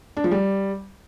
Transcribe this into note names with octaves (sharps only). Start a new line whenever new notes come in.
D4
F3
G3